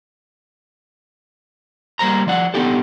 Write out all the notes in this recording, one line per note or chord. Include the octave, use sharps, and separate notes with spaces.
G3 A#3 C5 A#5
F3 D5 F#5
B3 C4 D#4 G4 A4